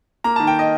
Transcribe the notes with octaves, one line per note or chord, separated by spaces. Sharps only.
A#3 A#5
D#3 A5
G5
D#5